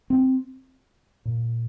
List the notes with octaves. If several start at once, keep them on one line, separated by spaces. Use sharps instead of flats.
C4
A#2